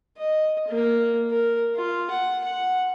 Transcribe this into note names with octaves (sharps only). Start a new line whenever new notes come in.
D#5
A#3
A#4
F4
F#5
F#5